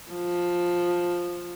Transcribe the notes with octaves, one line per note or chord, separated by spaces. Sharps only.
F3